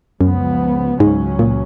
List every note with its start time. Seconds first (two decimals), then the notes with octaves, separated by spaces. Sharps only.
0.20 C#2 F#2 C#3 F3 B3
1.00 C#2 G#2 C#3 F#3 C#4
1.39 A#2